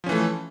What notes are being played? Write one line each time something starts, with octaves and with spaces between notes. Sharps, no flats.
E3 F3 A3 C#4